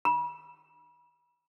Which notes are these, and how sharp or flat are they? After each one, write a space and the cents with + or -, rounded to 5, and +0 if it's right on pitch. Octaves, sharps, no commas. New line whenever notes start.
B5 -35